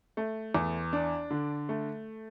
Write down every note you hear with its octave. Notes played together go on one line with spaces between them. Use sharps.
A3
E2
D4
D3
A3